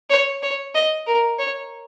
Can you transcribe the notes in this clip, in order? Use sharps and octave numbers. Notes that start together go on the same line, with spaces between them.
C#5
C#5
D#5
A#4
C#5